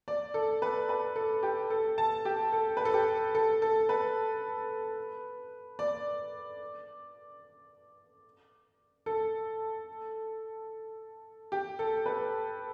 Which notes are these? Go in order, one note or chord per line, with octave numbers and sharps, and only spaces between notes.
D5
A4
B4
B4
A4
G4
A4
A5
G4
A4
B4
A4
G4
A4
A4
B4
D5
A4
G4
A4
B4